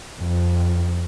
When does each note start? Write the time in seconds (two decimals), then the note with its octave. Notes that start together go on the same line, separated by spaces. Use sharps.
0.21 F2